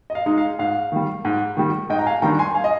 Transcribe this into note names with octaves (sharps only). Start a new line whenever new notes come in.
D#5
F5
G#3 D#4
F5
G#2 F5
D#3 G3
G#2
D#3 G3
G#2 D#5 G5
A#5
F5 G#5
D#3 G3 D4 G5 A#5
G#5 C6
F5 G#5
D#5